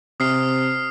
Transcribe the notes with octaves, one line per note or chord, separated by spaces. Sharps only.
C3 D#6 F6 C7